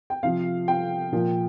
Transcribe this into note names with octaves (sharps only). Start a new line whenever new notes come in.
G5
C3 F3 F5
G5
A#2 F3